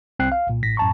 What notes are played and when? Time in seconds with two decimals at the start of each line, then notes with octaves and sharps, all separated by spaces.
0.19 C2 C4 G5 F#6 C7
0.32 F5
0.47 C2 A#2
0.63 A1 A2 A#6 B6
0.77 F#2 A2 A5 A#5 C#6